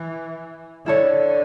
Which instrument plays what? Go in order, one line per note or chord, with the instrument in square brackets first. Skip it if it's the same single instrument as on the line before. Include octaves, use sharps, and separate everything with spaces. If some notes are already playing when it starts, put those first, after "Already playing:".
Already playing: [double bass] E3
[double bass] D3 [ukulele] E4 A4 C#5